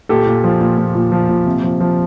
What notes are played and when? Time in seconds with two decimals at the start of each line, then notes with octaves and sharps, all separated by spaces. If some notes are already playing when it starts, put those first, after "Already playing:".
0.09 A#2 G4 A4
0.26 A#2
0.44 F3
0.61 A#2
0.78 A#2
0.95 A#2
1.12 F3
1.29 A#2
1.46 C3
1.63 F3
1.80 F3